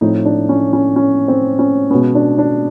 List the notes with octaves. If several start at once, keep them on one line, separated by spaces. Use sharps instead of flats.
A2 F3 A3 C4 D#4
D4
C#4
C#4
C#4
C4
C#4
B2 G#3 B3 C#4
D4
D4